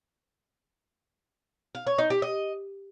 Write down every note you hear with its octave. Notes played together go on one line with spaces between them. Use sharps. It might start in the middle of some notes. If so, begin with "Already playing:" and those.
F5
C#5
D#4
G4
D#5